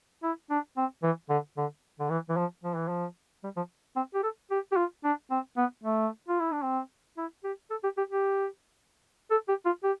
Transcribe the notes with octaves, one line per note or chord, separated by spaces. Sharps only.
E4
D4
C4
E3
D3
D3
D3
E3
E3
F3
F3
E3
F3
G3
F3
C4
G4
A4
G4
G4
F4
D4
C4
B3
A3
F4
E4
D4
C4
E4
G4
A4
G4
G4
G4
A4
G4
F4
G4